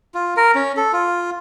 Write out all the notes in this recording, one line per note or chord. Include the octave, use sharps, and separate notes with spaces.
F4
A#4
C#4
A4
F4